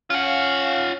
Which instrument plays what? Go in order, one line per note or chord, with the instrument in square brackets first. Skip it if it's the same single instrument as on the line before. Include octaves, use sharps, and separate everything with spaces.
[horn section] C#4 F5 [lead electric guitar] F4 F#5